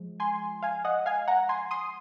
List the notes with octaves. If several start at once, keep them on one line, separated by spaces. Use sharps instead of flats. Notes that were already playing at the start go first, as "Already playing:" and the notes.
Already playing: F3 G#3
G#5 C6
F5 G#5
D#5 F#5
F5 G#5
F#5 A#5
G#5 C6
C6 D#6